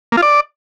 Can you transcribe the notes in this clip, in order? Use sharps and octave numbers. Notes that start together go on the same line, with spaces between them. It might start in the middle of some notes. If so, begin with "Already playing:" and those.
A#3
F4
D5